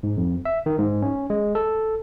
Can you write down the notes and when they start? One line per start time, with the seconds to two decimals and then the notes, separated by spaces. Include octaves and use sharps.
0.03 G#2
0.17 F2
0.45 E5
0.66 D#3
0.79 G#2
1.02 C#4
1.30 G#3
1.55 A4